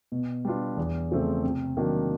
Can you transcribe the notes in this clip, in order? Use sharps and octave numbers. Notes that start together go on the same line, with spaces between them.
B2
G3 B3 D4 F4
E2
C#3 F3 A3 C4
C3
D#3 F#3 A#3 D4